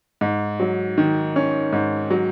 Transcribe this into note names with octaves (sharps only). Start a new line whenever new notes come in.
G#2
F#3
D#3
C#4
G#2
F#3